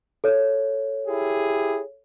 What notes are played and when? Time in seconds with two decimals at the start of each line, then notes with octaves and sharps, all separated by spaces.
0.24 A4 C#5
1.07 E4 G4 G#4